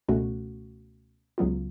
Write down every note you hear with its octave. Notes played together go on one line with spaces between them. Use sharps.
C#2 B2 A3 C#4 F#4
C#2 C#3 F#3 B3 F4